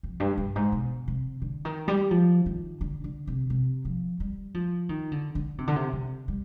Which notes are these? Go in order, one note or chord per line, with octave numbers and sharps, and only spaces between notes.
F2
G2
G2
G#2
B2
C3
D3
D#3
G3
F3
D#3
D3
D3
C3
C3
F3
G3
F3
D#3
D3
D3
C3
D3
C3
C3
G3